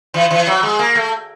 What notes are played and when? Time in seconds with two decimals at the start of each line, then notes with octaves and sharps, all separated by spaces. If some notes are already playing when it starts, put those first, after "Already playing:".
0.14 E3
0.31 E3
0.47 F#3
0.63 G#3
0.79 A#3
0.95 A3